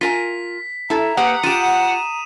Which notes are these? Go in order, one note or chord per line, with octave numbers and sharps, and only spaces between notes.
F4 A#4 G#5 B6
E4 A4 A#5
A#3 G4 B4 F#5 D#6
F4 G4 D#7 E7